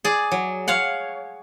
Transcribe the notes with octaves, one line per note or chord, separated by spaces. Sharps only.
G#4 D5
F#3
C#5 F5 F#5